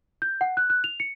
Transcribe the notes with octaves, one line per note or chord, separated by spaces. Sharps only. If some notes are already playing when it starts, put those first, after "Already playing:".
G6
F#5
F#6
F#6
F7
C#7